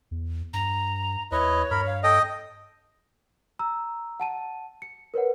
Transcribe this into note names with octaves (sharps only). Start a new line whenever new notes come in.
E2
G2 A#5
D#2 E4 B4 C#5 D#5
G2 A#4 B5
F5
A4 D#5 G5
A#5 E6
F#5 A5 D#7
C#7
A#4 B4 C#5 F#5